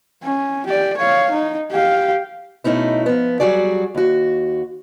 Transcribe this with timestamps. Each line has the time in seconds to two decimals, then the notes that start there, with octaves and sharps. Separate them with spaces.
0.23 C#4
0.66 G4 D5
0.97 C#5 F5
1.31 D#4
1.71 G4 F5
2.64 B2 A3 C#4 D#4 E4
3.06 F3 B3
3.40 F#3 G3 F#4 G#4 D5
3.95 D#2 F#4